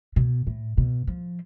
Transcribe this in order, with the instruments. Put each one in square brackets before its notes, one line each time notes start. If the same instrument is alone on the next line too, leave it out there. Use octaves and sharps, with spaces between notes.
[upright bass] B2
A2
B2
F3